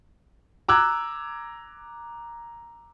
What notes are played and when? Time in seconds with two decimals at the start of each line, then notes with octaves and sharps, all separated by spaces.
0.69 A#5 D6 E6 F#6 G#6